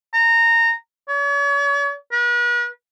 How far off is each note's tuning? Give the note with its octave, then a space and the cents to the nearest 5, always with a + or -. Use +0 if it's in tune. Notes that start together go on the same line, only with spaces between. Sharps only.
A#5 -20
C#5 +40
B4 -40